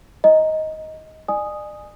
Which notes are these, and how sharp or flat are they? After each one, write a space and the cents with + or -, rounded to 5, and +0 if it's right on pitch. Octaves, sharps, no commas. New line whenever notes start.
D#5 +10 A#5 +0
D5 +40 G#5 +0 D#6 +0